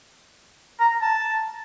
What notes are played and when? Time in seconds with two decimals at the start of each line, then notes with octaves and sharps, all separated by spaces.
0.80 A#5
1.02 A5